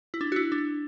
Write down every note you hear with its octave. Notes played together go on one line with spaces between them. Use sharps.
E4
D4
F#4
E4
D4